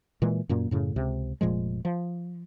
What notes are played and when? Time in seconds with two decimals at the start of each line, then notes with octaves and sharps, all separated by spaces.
0.22 A#2 E3 G#3
0.49 F#2 A#2 A#3
0.71 F#2 A2 C#3
0.96 C#2 C3
1.41 F1 A#2 F3 G#3
1.85 F3